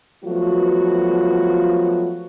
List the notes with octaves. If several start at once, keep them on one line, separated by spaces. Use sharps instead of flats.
F3 F#3 A3 B3 F4 F#4